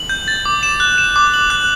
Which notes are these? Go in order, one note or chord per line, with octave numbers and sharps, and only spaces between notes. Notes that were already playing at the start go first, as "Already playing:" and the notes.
Already playing: F#7
G6
A6
D6
E7
F#6
E7
D6
F#7
F#6